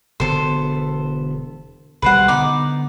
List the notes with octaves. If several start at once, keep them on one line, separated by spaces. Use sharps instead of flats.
E1 D3 B3 A4 C5
B1 D#3 G3 B4 C5 F#5
D3 B3 D#4 D6